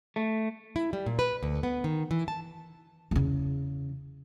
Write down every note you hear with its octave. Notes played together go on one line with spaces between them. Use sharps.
A3
E4
G3
A#2
B4
D2
B3
D#3
E3
A5
E2 C#3